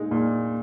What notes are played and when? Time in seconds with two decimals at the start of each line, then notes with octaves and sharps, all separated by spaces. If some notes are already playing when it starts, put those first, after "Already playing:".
Already playing: A#2 G#3 D#4
0.11 A#2